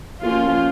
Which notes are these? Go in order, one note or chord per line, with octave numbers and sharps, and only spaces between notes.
F3 A#3 C#4 F4